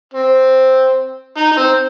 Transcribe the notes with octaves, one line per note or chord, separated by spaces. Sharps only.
C4
D#4
D#4
C4